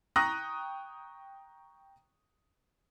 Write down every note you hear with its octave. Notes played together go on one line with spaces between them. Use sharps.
G5 A#5 C#6 D#6 F#6 A#6